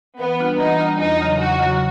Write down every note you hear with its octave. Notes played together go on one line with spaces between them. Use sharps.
E3 B3
G3 A#3 D4 F4
E3 D#4
G3 A#3 D4 F4
E2 D#4
C#3 F#3
E2 F#4
C#3 F#3